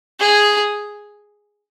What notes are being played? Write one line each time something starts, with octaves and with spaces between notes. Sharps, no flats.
G#4